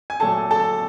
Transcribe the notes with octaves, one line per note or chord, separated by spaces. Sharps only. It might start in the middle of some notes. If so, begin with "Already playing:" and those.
G#5
A#2 F#3 A3 A4 A5
A4 A5